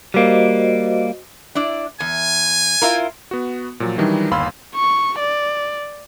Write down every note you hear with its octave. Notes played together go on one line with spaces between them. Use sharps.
G3 A#3 F#4 C5 D#5
D4 E4 D5
E2 G#5
E4 F4 A#4
B3 F#4
A#2 F3 F#3
D#3 E3 F#3 G3 D4 D#4
G1 D#2 F5 B5 C6 E6
C#6
D5